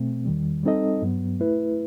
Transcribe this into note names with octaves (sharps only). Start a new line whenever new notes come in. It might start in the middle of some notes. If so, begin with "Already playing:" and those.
Already playing: B2 A3 C4
E2 D#3 G3
G3 C4 D#4 A4 D#5
G2 F#3 B3
A3 E4 B4